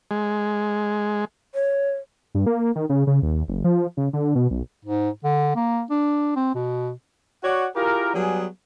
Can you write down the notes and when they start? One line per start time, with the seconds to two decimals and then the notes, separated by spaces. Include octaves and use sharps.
0.11 G#3
1.54 C#5
2.35 G2
2.46 A#3
2.75 D#3
2.89 C#3
3.07 C#3
3.22 D#2
3.48 F#1
3.64 F3
3.97 C#3
4.13 D3
4.35 B2
4.51 B1
4.85 G#2
5.24 D3
5.55 A#3
5.90 D4
6.36 C4
6.55 B2
7.43 F#4 C#5 D5 F#5
7.75 E4 F4 G4 G#4 A#4
8.14 F#3 G3 B3 G#4